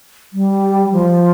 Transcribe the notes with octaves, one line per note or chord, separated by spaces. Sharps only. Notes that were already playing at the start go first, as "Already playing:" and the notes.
G3
F3